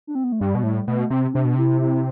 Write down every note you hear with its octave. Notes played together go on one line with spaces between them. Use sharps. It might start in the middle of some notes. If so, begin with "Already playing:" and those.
D4
C4
B3
A3
G2 G3
B2
A2 G3
B2 A3
C3 C4
C4
C3 D4
B2
C3 E4
E4